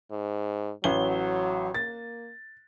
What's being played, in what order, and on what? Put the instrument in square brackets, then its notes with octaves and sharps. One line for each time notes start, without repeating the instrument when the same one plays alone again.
[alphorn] G#2
[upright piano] A1 G7 [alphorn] F#3
[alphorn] A#3 [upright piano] A6